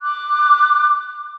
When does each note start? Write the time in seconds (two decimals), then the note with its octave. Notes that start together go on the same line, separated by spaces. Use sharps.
0.01 D6 F#6